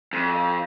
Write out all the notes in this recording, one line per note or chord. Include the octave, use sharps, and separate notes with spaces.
F2